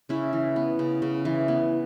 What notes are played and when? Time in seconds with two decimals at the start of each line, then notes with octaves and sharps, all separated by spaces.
0.09 C#3 C#4 E4
0.33 E3
0.56 B3
0.79 C#3
1.02 C#3
1.25 E3
1.48 B3